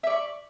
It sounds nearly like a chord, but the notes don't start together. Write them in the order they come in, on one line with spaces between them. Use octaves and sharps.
E5 D5 C#6